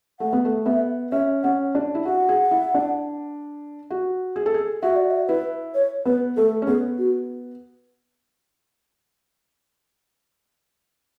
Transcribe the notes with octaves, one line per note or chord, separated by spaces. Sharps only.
A3 F#5
B3
A3
B3 E5
C#4 E5
C#4 F#5
D4
E4
F#4 F#5
G#4
E4
D4
F#4
G#4
A4
G#4
F#4 E5
D5
E5
E4 B4
C#5
B3 B4
A3 A4
C#4
B3 G#4
F#4